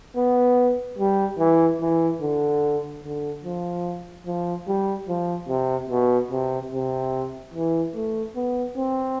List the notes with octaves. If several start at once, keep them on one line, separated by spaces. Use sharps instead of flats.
B3
G3
E3
E3
D3
D3
F3
F3
G3
F3
C3
B2
C3
C3
E3
A3
B3
C4